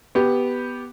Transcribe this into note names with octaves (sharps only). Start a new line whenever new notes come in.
B3 G4